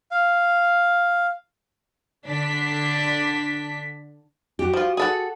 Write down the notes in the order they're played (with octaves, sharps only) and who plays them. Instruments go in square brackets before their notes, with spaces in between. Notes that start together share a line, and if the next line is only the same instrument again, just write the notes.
[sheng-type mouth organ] F5
[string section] D3 D4 B6
[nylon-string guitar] F#4 G4
[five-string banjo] F3 F4
G#4 A4 F#5